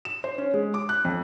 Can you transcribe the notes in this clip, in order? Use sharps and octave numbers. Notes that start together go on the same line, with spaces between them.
E7
C5
C#4
G#3
D6
F#6
F2